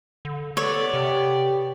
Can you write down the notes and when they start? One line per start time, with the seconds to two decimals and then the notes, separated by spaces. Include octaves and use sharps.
0.25 D3
0.57 B3 A4 C#5 D5
0.94 C3 G4